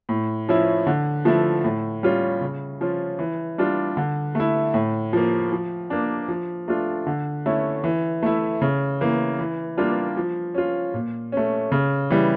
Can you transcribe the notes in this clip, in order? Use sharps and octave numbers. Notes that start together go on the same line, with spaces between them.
A2
F3 C#4 E4
D3
F3 A3 E4
A2
G3 C#4 F4
C#3
F3 C#4 F4
E3
G3 D4 F4
D3
A3 E4
A2
F3 A#3
F3
A#3 D4
F3
A3 D4 F4
D3
A3 C#4 E4
E3
A3 E4
C#3
E3 A#3
E3
G3 A#3 D4 F4
F3
C#4 F4
A#2
A3 C#4
C#3
E3 G3